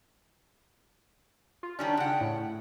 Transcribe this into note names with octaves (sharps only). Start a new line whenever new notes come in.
F4
D#3 G3 C#4 D4
C#3 F#5 G5
A2